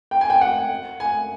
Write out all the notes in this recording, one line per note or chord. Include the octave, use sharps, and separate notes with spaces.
G5
G#5
G5
F#5
G#5